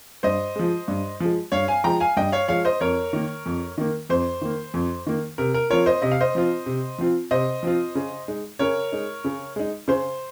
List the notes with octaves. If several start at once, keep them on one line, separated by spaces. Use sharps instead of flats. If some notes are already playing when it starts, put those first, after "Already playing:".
G2 C5 D#5
F3 G#3
G2
F3 G#3
G2 C#5 F5
F5 G#5
F3 G#3 G5 A#5
F5 G#5
G2 D#5 G5
C#5 F5
F3 G#3 C#5 F5
C5 D#5
F2 A#4 C#5
D#3 A#3
F2
D#3 A#3
F2 C5
D#3 A#3
F2
D#3 A#3
C3 A#4
A#4
F3 C4 F4 A#4 C#5
C5 D#5
C3 D#5
F5
C5 D#5
F3 C4 F4
C3
F3 C4 F4
C3 C5 D#5
F3 C4 F4
C#3
G#3 D#4
C#3 A#4 C#5
G#3 D#4
C#3
G#3 D#4
C#3 C5